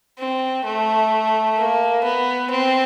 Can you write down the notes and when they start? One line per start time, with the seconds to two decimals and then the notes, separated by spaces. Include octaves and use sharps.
0.19 C4
0.65 A3
1.57 A#3
2.04 B3
2.50 C4